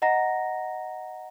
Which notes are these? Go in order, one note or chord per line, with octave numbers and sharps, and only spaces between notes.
D#5 F#5 A#5 A#6